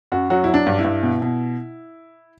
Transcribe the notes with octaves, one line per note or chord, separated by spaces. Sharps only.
F#2 F#4
F#3 F#4
F#3 E4
D4
G2
E4
G2
B2
B2